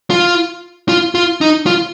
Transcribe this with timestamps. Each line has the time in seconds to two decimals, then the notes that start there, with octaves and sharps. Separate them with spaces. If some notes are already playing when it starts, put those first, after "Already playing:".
0.10 F4
0.89 F4
1.15 F4
1.41 D#4
1.66 F4